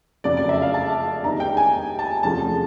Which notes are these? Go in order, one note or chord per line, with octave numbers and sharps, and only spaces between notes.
F1 F2 C#3 F#3 D5
D5
E5
F5
A5
D#2 D#3 G#3 B3 D#4 A#5
G5
G#5
A5
E2 C3 F3 A3 C#4 A5